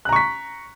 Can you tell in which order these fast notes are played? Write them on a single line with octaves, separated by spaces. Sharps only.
F#6 A#5 C#6 B6